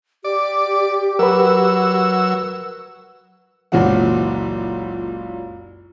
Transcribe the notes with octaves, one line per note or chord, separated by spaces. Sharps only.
G4 D5
F#3 A#4 B4 E6
F#1 C#2 A#2 E3 F#3 F#5